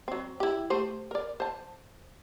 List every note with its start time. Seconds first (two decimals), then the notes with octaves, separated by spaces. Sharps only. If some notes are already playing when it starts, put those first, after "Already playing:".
0.08 F#3 C4
0.40 E4 G4
0.70 A3 G4 C5
1.11 A#4 D5
1.40 C5 A5